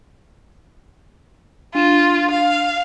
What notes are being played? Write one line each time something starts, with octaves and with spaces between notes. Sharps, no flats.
D4 F4 D#7 E7
F5